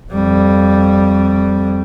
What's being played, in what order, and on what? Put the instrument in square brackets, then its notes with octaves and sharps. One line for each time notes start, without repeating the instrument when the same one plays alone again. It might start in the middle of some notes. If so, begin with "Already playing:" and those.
[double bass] F2 G3